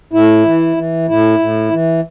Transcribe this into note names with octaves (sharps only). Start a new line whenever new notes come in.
A2 E4
E3
E3
A2 E4
A2
E3